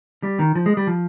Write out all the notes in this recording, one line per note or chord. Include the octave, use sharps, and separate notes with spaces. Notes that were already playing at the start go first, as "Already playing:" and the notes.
G3
D#3
F3
G#3
G3
F3